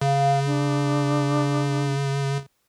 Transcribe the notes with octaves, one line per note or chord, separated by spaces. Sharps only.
C#3 F5
D4